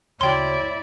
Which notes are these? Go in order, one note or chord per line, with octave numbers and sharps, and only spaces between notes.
D2 C#3 E4 F#4 C#5 D5 G5 C6